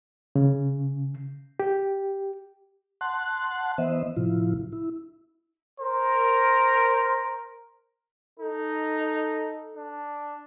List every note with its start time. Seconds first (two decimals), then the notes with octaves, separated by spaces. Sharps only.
0.36 C#3
1.60 G4
3.01 F#5 A5 C6 F#6
3.78 E3 B3 C5 D#5 E5
4.17 A2 C3 F3 E4 F4
4.73 E4
5.80 A#4 C5
8.39 D#4 A4
9.77 D4